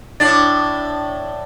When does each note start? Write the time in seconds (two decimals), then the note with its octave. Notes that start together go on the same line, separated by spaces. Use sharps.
0.20 A2 D4 A6